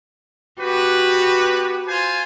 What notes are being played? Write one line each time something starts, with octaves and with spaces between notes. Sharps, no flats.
B3 F#4 G4 B4
F4 C5 G#5